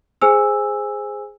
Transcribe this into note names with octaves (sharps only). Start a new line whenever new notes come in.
G#4 C5 G#5 E6